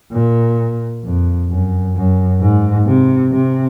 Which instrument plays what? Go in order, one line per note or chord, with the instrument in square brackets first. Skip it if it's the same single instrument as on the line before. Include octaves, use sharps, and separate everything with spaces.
[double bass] A#2
F2
F#2
F#2
G#2
C3
C3